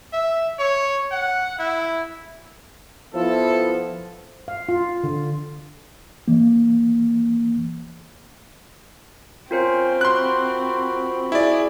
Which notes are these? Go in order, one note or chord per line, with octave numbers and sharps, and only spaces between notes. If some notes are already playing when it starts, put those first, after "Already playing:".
E5
C#5
F#5
E4
F3 B3 E4 A4
F5
F4
D3
E3 A#3
C4 C#4 F4 A#4 C5 G5
F#4 B5 C6 F#6
E4 G#4 D5